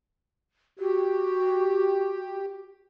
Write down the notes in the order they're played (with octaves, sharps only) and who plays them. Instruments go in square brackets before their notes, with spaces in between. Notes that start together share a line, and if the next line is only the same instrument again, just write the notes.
[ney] F#4 [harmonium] G4